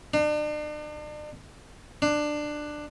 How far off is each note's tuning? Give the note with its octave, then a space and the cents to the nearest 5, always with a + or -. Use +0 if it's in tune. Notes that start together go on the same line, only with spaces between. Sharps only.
D4 +40
D4 +15